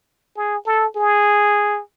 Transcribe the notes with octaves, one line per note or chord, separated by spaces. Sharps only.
G#4
A4
G#4